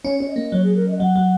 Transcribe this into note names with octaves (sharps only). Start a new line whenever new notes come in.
C#4 C#5
C#4 C#5
D#5
A#3
F#3 C#5
G#4
A#4
D#5
F#3 F#5
F#3